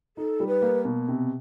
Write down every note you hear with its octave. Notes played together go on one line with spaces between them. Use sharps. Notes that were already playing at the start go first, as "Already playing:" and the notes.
D#4 A4
G3
B4
A#3
B2
C3